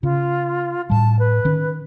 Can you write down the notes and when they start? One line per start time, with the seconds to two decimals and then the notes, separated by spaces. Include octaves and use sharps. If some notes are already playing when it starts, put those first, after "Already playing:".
0.03 C#3 F4
0.90 A2 G3 A5
1.19 B4
1.45 D#3 C#4